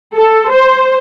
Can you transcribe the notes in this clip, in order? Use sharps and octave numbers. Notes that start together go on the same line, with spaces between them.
A4
C5